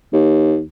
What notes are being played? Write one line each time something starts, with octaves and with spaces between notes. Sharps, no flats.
D#2